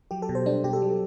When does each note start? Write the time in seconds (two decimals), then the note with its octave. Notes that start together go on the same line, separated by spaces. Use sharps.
0.11 F#3 G4
0.22 A4
0.29 B2
0.35 C5
0.46 G3 D4
0.64 B2 G4
0.73 A4
0.82 F#3